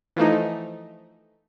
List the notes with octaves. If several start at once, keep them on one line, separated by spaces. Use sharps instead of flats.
E3 F3 A3 D#4